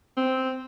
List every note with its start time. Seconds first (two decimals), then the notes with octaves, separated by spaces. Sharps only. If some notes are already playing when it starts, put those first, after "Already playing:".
0.17 C4